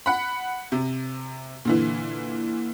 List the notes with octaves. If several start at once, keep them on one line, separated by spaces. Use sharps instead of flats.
F#5 B5
C3
A#2 D3 E3